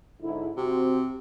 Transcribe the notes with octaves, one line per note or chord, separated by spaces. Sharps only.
G#2 D3 E4
C3 C4 F#4